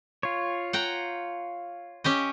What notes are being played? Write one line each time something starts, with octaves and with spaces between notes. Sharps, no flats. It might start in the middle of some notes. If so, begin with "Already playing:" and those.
F4 C#5
F#5 G5 A#5
C#4 G4 D#5